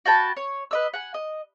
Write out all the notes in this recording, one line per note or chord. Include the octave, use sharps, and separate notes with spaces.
F#4 G5 A5 B5
C#5
B4 D#5 E6
F#5 G#5
D#5